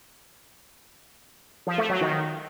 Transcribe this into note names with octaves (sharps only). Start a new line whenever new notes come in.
F3
A3
F#3
D#3